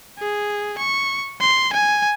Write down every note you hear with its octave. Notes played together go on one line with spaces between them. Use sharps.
G#4
C#6
C6
G#5